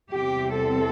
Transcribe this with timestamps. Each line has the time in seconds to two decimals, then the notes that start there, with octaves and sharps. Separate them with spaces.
0.12 E2 C3 G3 C4 G4
0.56 A4